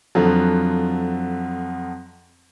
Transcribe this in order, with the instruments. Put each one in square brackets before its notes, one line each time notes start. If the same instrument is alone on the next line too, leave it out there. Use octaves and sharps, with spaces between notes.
[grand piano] F2 D3 F3 F#3